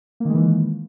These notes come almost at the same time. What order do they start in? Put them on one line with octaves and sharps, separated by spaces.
A#3 D#3 G#3 E3